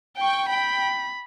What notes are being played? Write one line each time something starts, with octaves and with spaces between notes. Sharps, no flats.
G5 C#6
G5 B5